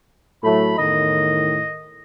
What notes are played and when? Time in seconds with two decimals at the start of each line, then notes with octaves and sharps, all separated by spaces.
0.44 A2 F#3 A3 B5
0.78 E2 A2 D#3 D#5